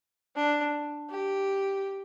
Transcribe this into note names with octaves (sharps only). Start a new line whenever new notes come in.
D4
G4